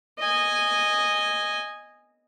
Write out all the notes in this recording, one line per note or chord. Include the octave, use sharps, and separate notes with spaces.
D#5 G#5